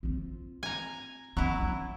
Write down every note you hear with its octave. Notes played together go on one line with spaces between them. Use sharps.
C4 F4
G#5 A#5
F#3 C4 E4
G#3 D4